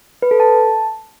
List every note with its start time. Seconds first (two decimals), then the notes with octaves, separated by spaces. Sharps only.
0.22 B4
0.31 A4
0.40 A5